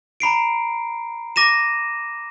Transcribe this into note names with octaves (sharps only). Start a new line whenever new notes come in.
A#5 B5 C7 D7
D6 A#6 D#7 E7